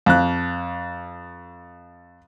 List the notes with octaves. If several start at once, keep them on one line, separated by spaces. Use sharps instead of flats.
F2 F#6